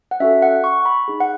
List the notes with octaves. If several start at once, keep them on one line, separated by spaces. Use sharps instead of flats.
F#5
C#4 F#4 A4 E5
F#5
C#6
B5
D#4 G#4
F#5